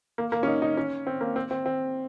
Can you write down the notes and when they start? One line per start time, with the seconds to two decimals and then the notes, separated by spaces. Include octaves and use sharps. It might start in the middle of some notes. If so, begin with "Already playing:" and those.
0.18 A#3
0.32 A#3
0.43 C#4
0.47 D#4
0.62 D#4
0.77 C#4
1.07 C4
1.21 A#3
1.36 C4
1.51 C4
1.66 C4